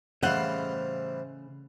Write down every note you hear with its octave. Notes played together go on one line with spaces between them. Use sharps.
A2 C#3 E3 G3 C5 D#5 F5 F#5